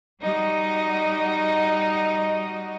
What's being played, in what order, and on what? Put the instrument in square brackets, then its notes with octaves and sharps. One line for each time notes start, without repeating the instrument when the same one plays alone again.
[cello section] G3 F#4 D#5 [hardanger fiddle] D#4